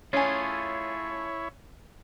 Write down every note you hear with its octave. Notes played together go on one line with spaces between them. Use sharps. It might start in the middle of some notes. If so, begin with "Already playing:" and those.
A3 C#4 E4 F4 G#4 C#5 G#5